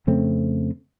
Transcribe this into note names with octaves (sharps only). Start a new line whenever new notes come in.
F2 C#3 A3 C4